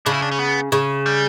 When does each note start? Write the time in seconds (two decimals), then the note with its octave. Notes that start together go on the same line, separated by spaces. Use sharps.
0.06 C#3 D4
0.14 E4
0.22 D4
0.32 C#4
0.39 B3
0.72 C#3
1.06 G3